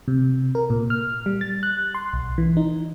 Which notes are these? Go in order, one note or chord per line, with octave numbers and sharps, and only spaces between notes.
C3
A#4
A#2
F6
G3
A6
F#6
C6
B1
E3
D#4